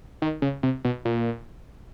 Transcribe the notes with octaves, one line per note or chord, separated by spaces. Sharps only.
D#3
C#3
C3
B2
A#2